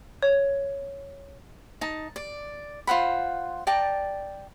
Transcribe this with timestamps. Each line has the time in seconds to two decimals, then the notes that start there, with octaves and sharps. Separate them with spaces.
0.23 C#5
1.81 D#4 A5
2.16 D5
2.87 F4 C5 F#5 B5
3.67 D5 G5 A5 A#5